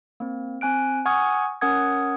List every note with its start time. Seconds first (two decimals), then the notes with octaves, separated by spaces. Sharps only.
0.20 A#3 C4
0.61 C4 G#5 F#6 D7
1.06 F#5 G#5 C#6 D#6 F6 G#6
1.61 C#4 A#4 F#5 D#6 G#6